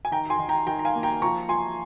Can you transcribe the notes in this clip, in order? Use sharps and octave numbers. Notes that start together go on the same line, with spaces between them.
G#5
D#3 G5 A#5
G#5 C6
D#3
G5 A#5
D#3 G5 A#5
A#5
F5 G#5
A#3
G5 A#5
F3 A#5 C#6
F3 G#5 C6